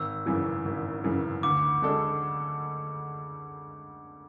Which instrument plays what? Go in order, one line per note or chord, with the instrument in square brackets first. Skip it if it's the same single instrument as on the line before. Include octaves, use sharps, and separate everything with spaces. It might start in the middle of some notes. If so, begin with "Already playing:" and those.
Already playing: [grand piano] G#1 [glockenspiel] E6
[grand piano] F#2 C#3 E3
G#1
F#2 C#3 E3
[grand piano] D2 [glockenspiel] D6
[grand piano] D3 G#3 D4 A4